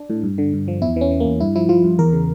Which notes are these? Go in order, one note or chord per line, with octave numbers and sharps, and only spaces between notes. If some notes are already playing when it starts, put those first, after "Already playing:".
Already playing: D4
A2
G2
D3
G2
F3
E2 E4
E3 C#4
E3
A#3
E2
G2 E4
F3 E4
F3 F4
G2
E2 A#4
C#3